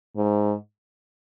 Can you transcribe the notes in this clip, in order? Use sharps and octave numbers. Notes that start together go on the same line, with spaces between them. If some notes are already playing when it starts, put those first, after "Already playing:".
G#2